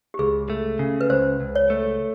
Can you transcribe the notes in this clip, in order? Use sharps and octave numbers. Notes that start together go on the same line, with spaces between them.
G4
C#2 G#4
A3
C#3
B4
C#2 C5
C#2
C#5
A3